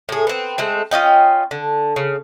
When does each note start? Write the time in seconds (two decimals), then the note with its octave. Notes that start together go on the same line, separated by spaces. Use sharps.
0.09 A2 G#4
0.27 B3 C4
0.58 G#3 A3 C4
0.91 C#4 F4 D#5 G5
1.51 D3
1.96 C#3